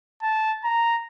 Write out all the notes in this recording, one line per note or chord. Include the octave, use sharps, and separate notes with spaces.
A5
A#5